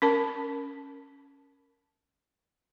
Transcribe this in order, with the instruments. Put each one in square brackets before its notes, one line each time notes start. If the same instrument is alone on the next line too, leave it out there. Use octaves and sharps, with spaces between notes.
[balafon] C#4 A#4 A5